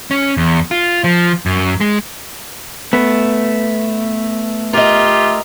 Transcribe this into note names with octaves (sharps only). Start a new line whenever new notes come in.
C#4
E2
F4
F3
F#2
G#3
A3 B3
F4 G4 A#4 D#5 E5